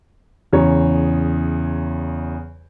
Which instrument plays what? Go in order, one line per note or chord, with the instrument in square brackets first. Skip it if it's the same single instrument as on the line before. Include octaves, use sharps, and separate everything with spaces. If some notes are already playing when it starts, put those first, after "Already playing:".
[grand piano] E2 C#3 C#5 A#5